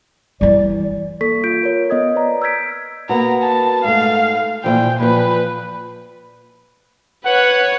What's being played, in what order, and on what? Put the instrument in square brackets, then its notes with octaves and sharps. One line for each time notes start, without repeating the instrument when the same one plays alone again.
[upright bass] E3 G3 [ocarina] D5
[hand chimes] A#3 A4 C#6 B6
F4 G6 D7
A#4 C#5
B3 D#5 D#6 G#6
B4 D5 A#5
E6 F6 G6 G#6 B6 D7
[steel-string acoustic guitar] A#3 B3 F#4 [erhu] A#5
[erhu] A5
[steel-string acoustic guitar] G#2 A3 [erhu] F5
[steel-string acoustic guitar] A#2 E3 F3 [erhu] G5
[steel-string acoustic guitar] A#2 F3 [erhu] B4
[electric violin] B4 C#5 [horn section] F#5